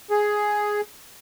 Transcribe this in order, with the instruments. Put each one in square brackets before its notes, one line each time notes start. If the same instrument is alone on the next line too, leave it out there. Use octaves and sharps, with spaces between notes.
[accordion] G#4